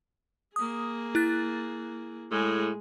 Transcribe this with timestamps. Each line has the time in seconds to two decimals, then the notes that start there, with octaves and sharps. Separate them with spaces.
0.56 A#3 G#4 D#6
1.15 E4 F#6 A6
2.31 A2 G#3 G#4